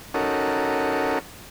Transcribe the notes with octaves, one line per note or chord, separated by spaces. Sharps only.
C#4 D#4 F#4 A4 A#4